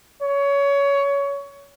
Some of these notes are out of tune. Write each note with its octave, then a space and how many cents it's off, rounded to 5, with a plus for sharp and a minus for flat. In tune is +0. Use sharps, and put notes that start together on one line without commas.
C#5 +20